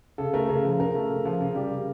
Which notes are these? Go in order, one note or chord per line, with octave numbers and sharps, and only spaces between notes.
C#3 A4
A3 A#4
C#3 A#4
F3
C#3 A#4
A3
C#3
F3
C#3
G3
C#3